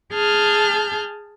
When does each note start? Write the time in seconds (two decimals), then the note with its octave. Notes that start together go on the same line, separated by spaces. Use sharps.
0.14 G#4 A5 F6 G6